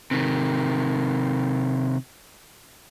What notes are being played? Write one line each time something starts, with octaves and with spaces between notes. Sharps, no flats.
C3 D#3